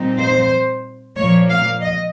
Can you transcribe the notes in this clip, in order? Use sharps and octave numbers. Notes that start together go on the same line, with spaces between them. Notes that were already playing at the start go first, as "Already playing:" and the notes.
Already playing: A#2 G3 C4 D#4
C5
A#2 F3 A#3 C#5
F5
D#5